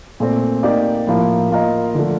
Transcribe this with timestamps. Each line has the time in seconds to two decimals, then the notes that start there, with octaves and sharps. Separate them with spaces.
0.20 A#2 A3 C4
0.63 A#3 D#4 G4 D5
1.07 A2 F3 A#3
1.51 A#3 F4 A#4 D#5
1.95 D3 F3 A3